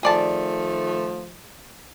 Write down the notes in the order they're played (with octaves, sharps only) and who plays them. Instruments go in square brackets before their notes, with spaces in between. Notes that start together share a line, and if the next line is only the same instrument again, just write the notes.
[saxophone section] D#3 F3 A3 [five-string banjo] G#4 D5 A5